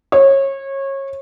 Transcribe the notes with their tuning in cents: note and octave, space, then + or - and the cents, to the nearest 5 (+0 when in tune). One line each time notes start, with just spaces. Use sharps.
C#5 -25